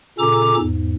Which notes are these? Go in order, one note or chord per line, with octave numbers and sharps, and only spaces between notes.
A#2 C#3 C#4 A4 A#5 D6
E2 G#2